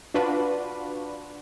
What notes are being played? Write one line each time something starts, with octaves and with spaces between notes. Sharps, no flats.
D4 F4 F#4 B4